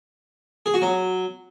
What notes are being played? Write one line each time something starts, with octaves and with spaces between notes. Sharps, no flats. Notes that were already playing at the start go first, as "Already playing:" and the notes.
G#4
F#4
F#3